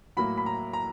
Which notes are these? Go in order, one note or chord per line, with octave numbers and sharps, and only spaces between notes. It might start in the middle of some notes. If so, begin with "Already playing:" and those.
A2 F#3 A#3 B5
B5
A#5
A#5